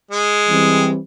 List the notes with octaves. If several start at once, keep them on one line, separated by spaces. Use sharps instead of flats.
G#3
E3 G3 C4